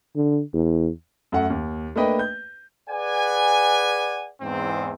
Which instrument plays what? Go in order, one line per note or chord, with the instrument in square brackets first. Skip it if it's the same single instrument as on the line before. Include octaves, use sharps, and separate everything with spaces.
[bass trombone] D3
E2
[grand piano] F#2 A3 F#5
D#2
A3 A#3 D4 B4 D#5 G5
G6
[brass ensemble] G#4 B4 D5 F#5 G#5
E2 G#2 C4